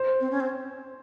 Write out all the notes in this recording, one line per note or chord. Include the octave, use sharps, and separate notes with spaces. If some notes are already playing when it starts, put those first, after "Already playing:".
Already playing: C5
C4
C#4
C4